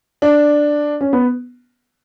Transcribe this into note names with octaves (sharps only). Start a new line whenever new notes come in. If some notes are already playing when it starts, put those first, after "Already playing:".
D4
C#4
B3